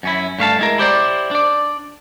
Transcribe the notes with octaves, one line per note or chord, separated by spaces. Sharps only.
F#2 C#4 E4
G2 A3 F5 A5
G#3 E4 A#4
E4 G4 C5 D5
D4 D5